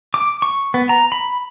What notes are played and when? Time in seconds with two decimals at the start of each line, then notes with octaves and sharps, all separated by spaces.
0.14 D6
0.42 C#6
0.74 B3
0.89 A#5
1.12 B5